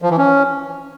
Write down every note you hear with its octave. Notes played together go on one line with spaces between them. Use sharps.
F3
E3
C#4